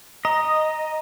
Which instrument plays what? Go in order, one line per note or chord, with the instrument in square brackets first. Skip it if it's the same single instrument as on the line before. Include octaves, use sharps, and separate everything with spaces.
[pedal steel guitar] D#5 [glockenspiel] A#5